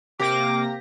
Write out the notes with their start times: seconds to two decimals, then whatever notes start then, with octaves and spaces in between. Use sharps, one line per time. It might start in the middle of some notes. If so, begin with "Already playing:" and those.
0.19 C3 A#3 G4 D6 A#6